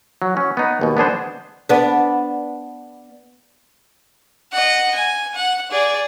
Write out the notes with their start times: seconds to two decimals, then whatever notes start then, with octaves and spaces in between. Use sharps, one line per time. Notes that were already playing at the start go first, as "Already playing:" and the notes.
0.22 F#3
0.37 C#4
0.57 B3 D#4
0.81 D#2 B2
0.97 B3 D4 G#4 C5
1.69 B3 D4
4.52 D#5 F#5
4.95 G#5
5.35 F#5
5.71 G#4 D5